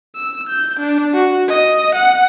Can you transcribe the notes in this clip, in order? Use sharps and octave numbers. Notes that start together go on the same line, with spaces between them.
E6
G6
D4
F#4
D#5
F#5